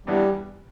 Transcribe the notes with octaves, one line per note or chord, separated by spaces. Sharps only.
E2 E3 G3 B3 D4